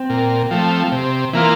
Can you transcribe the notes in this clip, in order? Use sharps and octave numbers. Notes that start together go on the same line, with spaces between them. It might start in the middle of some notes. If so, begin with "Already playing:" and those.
Already playing: C4
A#2
F3 A3
C3
E3 A#3 F4